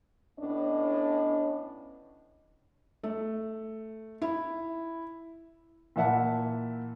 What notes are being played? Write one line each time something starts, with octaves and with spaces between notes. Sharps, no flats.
A2 B3 C#4 D4 D#5
A3
E4
A#2 E3 E5 F#5 A5